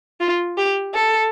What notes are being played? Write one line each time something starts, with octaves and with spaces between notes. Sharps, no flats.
F4
G4
A4